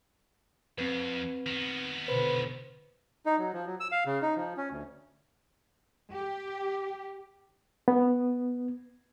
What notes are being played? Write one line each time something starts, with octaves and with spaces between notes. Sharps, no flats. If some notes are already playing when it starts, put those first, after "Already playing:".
F2 C4 B4
D#3 B3
B2 D3 B4 C5
D#4
F#3
F3
F#3
E6
F5
C#3
D#4
F3
C#4
D2
G4
B3